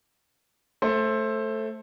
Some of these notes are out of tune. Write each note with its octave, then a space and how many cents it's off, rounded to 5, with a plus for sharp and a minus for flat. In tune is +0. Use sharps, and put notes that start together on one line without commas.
A3 +0 C5 +20